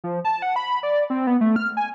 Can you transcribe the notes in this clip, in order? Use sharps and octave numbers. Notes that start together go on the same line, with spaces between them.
F3
A5
F#5
B5
D5
C4
B3
A3
F6
G#5